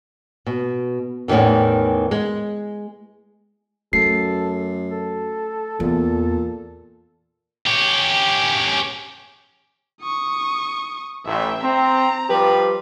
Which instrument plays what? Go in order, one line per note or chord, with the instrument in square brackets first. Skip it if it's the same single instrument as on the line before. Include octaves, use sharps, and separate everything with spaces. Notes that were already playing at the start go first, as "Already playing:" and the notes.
[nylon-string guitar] B2
E2 A2 C3 D#3 E3
G#3
[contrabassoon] F#2 [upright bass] A3 [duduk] A4 [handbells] C7
[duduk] A4
[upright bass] E2 [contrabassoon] A#2
[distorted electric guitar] C#4 G4
[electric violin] C#6 D#6
[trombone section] A1 [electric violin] E5 G5
[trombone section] C4 [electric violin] A#5
[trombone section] F3 G3 G4 [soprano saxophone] B4